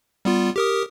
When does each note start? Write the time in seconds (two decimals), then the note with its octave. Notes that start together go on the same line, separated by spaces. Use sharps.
0.25 G3 B3 F4
0.56 G4 A#4 D#6